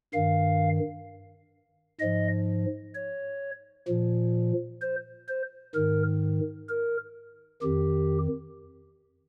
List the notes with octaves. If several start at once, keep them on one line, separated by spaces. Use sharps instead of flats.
G2 D#3 F5
G#2 F3 D#5
C#5
A#2 F3
C5
C5
G#2 D#3 A#4
A#4
F2 D#3 G4